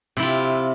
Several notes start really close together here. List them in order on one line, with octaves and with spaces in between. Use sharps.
C3 E4 F4